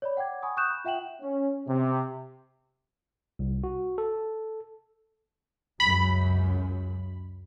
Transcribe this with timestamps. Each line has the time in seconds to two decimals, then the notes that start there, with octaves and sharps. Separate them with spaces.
0.02 C#5 D5 B5
0.17 F#5 G5 D6 G#6
0.42 F#5 G#5 B5 C#6 D#6
0.57 C#6 D#6 F#6 G6 E7
0.70 B5
0.85 F4 E5 F#5 G5 E7 F#7
1.21 C#4
1.66 C3
3.39 C2
3.64 F#4
3.98 A4
5.80 C#2 F#2 B5